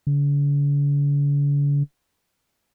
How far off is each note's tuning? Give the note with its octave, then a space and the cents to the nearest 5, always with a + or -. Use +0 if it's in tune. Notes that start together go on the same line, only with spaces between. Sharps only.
D3 -45